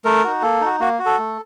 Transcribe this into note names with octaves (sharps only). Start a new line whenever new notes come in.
A3 A#4
D#4 F#4
A#3 A4
D#4 F#4
A#3 F#4
F#4
A4
A3